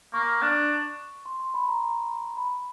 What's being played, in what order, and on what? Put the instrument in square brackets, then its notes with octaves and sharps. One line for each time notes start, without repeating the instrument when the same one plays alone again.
[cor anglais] A#3 [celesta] C#6
[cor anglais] D4
[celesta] C6
C6
B5
A#5
B5